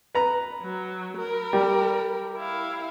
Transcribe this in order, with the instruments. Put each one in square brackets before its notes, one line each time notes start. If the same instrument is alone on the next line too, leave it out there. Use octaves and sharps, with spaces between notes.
[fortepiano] B4 A#5
[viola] F#3
A#4 B5
[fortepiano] G3
[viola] E4 F5